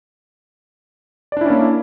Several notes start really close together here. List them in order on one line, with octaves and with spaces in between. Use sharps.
D5 D4 E4 C#4 A#3